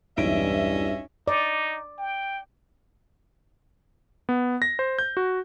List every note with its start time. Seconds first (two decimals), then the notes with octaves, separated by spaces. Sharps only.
0.17 B1 E2 G2 C#4 D#5 E5 D7
1.28 D#4 D5
1.98 G5
4.29 B3
4.62 A#6
4.79 C5
4.99 G6
5.17 F#4